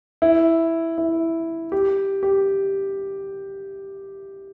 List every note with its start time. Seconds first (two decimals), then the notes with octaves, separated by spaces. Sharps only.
0.22 E4
0.98 E4
1.72 G4
2.23 G4